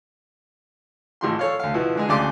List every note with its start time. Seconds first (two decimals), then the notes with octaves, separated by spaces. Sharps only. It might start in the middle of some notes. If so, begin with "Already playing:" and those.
1.21 G#1 A2 F3 C6
1.39 A4 C#5 F5
1.59 D2 F5
1.74 B2 F3 B3 E4
1.95 D3 G#3 G#4
2.09 D2 C#3 G#4 D5 C6 D6